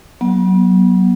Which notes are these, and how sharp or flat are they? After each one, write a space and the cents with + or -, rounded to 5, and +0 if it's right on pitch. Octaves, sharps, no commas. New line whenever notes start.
F#3 +10 B3 -40